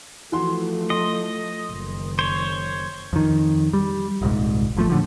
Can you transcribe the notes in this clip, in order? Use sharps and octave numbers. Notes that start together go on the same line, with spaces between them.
E3 F3 A3 F#4 C6
D#5 C6
F#1 D#3
C5 C#5
F2 D#3
G3
D#1 C2 G#2
G1 F3 A3
A2 D3 F3